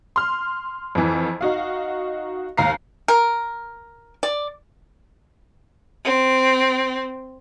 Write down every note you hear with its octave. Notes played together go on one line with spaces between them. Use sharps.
C6 F6
F2 E3
D#4 F#4 F5
D#2 F5 A#5 C7
A#4
D5
C4